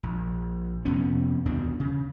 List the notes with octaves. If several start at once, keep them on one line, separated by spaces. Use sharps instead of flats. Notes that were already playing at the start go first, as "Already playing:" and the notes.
A#1
F2 C3 B3 C#4
D#2 B2 D4
C#3